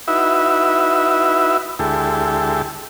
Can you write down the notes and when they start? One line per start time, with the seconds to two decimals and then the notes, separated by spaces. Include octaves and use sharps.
0.08 D#4 E4 F#4 B4 E5
1.79 D2 G#3 E4 G4 A4